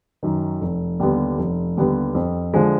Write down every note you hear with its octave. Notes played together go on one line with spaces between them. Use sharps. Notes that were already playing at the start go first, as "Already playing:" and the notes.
F#2 D#3
F1
D#2 D3 G3 B3
F1
D#2 D3 G3 B3
F2
D3 F3 G#3